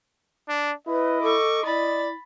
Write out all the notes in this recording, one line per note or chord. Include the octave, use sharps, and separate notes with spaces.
D4
E4 B4 D#5
A4 C#6 D6
E4 D5 B5 A6